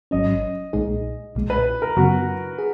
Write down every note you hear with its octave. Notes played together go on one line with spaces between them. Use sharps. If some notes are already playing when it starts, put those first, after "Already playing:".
G#1 G#2 F#3 C#4 D#5
B1 A#2 G#3 D#4 G#4
B1 A#2 G#3
B4
A#4
F#2 C#3 F#3 B3 F#4
G#4